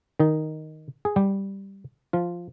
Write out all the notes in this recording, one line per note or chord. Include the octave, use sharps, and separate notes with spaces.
D#3 D#4
G#4
G3 G4
F3 F4